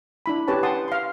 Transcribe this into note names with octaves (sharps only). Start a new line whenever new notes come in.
D4 E4 B5
C#4 G4 B4 C#5 A5
F#5 G5 A5 C6 D#6
F5 C6